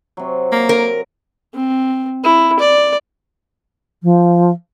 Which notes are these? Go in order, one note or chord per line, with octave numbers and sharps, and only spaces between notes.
C3 F#3
A#3
A#4
C4
E4
D5
F3